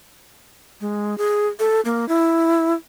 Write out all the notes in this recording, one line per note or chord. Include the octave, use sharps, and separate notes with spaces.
G#3
G#4
A4
A#3
E4